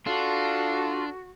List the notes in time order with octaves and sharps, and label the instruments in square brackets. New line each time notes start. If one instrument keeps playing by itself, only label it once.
[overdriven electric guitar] D4 [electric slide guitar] F4 [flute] F#4 [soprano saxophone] A4